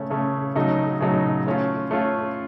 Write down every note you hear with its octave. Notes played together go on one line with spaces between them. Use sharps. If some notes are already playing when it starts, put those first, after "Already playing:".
Already playing: C#3 A3 C#4
C#3 A3 C#4
C#3 F#3 A3 D#4
C#3 F#3 A3 D#4
A3 C#4 F4
A3 C#4 F4